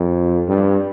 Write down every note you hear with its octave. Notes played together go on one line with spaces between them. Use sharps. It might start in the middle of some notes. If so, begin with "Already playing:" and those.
Already playing: F2
G2